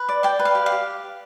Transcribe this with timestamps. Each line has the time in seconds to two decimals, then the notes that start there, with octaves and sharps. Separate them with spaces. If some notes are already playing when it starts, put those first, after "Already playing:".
Already playing: B4
0.09 D5
0.23 D5 G5
0.39 B4
0.45 F5
0.55 G4
0.66 F5
0.72 G4